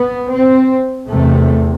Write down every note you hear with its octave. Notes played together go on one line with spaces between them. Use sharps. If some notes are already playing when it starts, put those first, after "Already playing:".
Already playing: B3
C4
E2 C3 A3